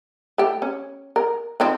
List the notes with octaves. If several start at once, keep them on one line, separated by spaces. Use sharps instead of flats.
A3 G4
C#4
A#4
F3 C4 D#4